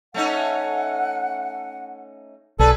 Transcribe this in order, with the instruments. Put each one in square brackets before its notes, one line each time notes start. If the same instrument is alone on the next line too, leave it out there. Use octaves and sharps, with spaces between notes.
[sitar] A3 C#4 D#4 [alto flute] F#5
[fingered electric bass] B1 [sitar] G#4 B4 [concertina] A4 [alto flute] D5